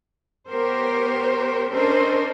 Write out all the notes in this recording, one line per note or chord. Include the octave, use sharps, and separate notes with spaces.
B3 G4 A#4 C5 C#5
C#4 D4 A4 A#4 C5 D#5